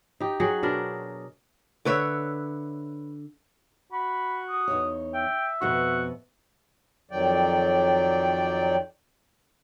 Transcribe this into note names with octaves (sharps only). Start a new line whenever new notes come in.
D#4 G4
F#3 F#4 G#4 G5
B2 D4 A#4
D3 B4 C#5 E5
F#4 B5
D#6
E2 D#4 C#5
E5 G5
F2 B2 B3 F#4
F2 D#3 F#3 D5 G5